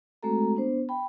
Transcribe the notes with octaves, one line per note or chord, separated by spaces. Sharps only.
G#3 A3 C4 F#4 A4 A#5
B3 D4 C5
G5 A5 B5